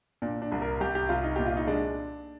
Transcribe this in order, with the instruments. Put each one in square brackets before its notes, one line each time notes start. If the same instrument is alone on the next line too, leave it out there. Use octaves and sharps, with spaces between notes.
[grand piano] A#2 D4
D4
C2
A#4
C2 G4
G4
C2 F4
D#4
A#2 G4
F4
D#4
G#3 D4